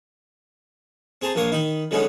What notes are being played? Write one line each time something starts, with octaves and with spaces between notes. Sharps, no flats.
C4 G#4 A5 A#5 C6
A#1 A#2 A#3 C#5 D#6
D#3 D#4 B5
D3 F#3 G#3 B3 C#4 D#4